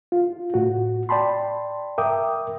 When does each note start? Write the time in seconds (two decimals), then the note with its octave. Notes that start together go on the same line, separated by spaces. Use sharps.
0.12 F4
0.54 A2 F#4
1.09 D5 G5 A5 B5 C6
1.98 A#4 E5 G5 D6 D#6